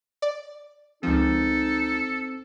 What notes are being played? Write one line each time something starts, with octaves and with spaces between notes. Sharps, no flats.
D5
C#2 F3 C4 D#4 A4